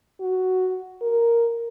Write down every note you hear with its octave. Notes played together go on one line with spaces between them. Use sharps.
F#4
A#4